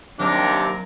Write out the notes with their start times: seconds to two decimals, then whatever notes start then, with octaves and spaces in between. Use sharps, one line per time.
0.19 D#2 C3 F#3 D4 A#4